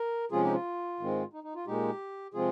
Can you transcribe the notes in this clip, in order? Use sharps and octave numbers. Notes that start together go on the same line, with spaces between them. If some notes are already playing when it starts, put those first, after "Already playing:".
Already playing: A#4
C3 F3 G#3 C#4 F4 G#4
D#4 G4
F4
G#2 D#3 G#3 C4
D#4
D#4
F4
A#2 G#3 D#4 G4
C3 F3 G#3 C4 F4 G#4